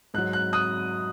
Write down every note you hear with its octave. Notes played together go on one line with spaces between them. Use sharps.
G#2 F#3 F#6
F#6
D#6 F#6